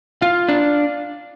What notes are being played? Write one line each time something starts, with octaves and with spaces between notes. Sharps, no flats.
F4 F5
D4